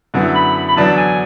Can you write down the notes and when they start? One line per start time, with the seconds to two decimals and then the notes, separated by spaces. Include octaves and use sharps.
0.14 F#2 D3 F#3 B3 E4
0.35 B5
0.68 B5
0.76 E2 D3 F#3 B3 D4 A5
0.97 G#5